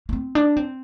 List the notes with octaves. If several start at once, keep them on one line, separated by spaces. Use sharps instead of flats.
A#3
C4
D4
C4